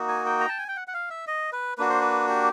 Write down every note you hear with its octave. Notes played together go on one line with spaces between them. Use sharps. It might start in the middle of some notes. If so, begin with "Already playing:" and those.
Already playing: A#3 D#4 F#4
G#5
G5
A#5
A5
G#5
G5
F#5
F#5
F5
E5
D#5
B4
A#3 D4 F#4 B4
C5
B4
G4